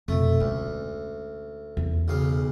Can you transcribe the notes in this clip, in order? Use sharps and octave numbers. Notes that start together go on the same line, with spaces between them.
F2 B2 A3
D2 G#3 C#4
E2
B1 C#3 F5